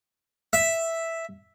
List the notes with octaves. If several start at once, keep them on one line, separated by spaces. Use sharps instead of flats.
E5